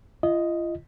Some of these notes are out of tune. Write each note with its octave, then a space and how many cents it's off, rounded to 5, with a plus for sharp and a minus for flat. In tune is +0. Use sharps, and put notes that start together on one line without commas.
F4 -40 D#5 +0